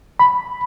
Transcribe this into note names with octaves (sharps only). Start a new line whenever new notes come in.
B5